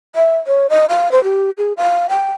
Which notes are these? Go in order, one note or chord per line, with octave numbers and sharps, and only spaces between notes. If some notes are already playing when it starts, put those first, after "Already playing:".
E5
C#5
D#5
F5
C5
G4
G#4
F5
G5